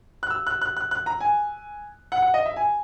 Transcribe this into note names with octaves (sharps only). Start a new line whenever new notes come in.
F#6
E6
F#6
F#6
F#6
F#6
A#5
G#5
F#5
F#5
D#5
E5
G#5